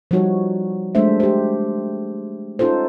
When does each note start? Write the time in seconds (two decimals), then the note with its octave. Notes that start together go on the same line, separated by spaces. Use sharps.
0.11 F3 G3 D#4 F#4 C#5
0.95 G#3 A3 D4 C5 E5
1.20 G4 C5
2.59 C#4 D#4 F4 A4 C5